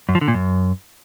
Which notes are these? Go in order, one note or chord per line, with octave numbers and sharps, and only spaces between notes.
F#2
F3
D3
A#2
F#2